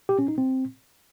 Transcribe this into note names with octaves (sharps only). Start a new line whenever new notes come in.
G4
C#4
D#4
C4